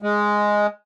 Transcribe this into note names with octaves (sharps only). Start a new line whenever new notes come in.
G#3